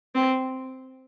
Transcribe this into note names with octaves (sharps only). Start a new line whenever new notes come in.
C4